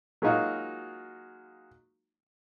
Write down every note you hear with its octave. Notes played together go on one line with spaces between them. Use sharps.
F#3 G#3 A#3 D#4 F4 F#4